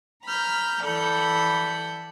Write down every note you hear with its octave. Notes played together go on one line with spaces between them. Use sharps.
A#5 B5 F6 G6
E3 A4 D5 F#5 B5 G6